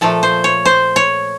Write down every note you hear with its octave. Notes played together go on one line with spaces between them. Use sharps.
A#2 F3 A3 A4
C5
C#5
C5
C#5